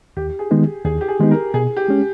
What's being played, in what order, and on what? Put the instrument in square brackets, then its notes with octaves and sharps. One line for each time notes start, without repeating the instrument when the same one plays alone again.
[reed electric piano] D#2 [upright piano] G4
[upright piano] G#4
[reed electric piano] D#3 G#3 B3 D#4
[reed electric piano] D#2 [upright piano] G#4
[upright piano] G4
G#4
[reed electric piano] D#3 G#3 B3 D#4
[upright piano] A#4
[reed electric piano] B2 [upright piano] G#4
[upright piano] G4
[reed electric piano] G#3 C#4